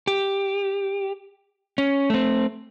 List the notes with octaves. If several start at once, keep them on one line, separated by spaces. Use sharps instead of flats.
G4
C#4
A3 C4